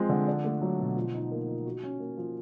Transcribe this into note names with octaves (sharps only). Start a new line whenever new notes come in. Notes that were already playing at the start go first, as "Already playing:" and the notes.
Already playing: F3 G#3 C4
D3
D4
A3
F#3
B2
F3
D#4
A#3
F3
F#4
C#4
A#3
F3